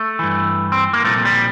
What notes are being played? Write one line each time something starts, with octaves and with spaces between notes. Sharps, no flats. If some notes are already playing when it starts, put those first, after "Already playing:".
Already playing: A3
G2 E3
C4
A#3
C2 A#2 F3 A3
G3